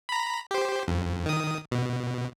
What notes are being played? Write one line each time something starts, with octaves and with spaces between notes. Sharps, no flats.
A#5 B5
G4 C5
F2
D#3 D#6
B2